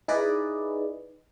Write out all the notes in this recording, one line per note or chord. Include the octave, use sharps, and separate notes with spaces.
D#4 E4 G#4 B4 D5 D#5